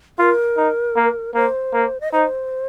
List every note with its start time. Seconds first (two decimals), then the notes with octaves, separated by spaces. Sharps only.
0.19 F4 A#4
0.57 D#4
0.96 A#3
1.35 A#3 C5
1.73 A#3
2.01 D#5
2.13 D#4 C5